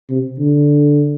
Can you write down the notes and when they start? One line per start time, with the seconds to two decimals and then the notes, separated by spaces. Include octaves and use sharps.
0.10 C3
0.39 D3